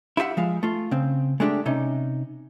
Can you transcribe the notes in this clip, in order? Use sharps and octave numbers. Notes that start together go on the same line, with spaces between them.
E4 F4 G4 E5 F#5
F3 G#3 F5
A3 F4
C#3 C4
G#3 A3 D4 F#4 G4
C3 C#4 D#4